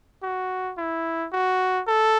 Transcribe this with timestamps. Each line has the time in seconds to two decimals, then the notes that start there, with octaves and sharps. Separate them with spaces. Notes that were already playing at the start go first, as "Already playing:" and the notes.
0.23 F#4
0.78 E4
1.33 F#4
1.87 A4